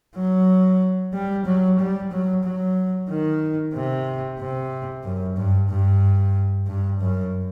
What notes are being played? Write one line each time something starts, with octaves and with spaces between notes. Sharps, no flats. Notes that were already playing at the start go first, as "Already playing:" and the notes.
F#3
G3
F#3
G3
F#3
F#3
D#3
C3
C3
F#2
G2
G2
G2
F#2